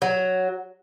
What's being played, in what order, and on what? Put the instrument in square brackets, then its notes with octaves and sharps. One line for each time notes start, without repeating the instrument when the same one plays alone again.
[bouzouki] F#3